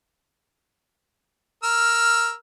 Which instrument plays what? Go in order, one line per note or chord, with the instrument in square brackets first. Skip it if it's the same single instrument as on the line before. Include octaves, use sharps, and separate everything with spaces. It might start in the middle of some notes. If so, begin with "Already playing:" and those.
[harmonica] A#4 E6 F6